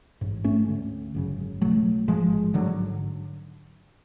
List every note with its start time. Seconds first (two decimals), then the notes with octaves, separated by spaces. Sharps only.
0.21 A1 G#2
0.44 A3 C#4
0.68 D2 D3
1.14 G#1 F#2 C#3
1.61 B1 B2 F#3 A3
2.08 A1 G#2 F3 G#3
2.54 G#1 G#2 D3 F#3